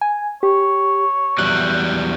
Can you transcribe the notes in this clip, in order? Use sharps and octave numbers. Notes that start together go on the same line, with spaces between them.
G#5
G4 C#5
E2 F#3 G3 F#6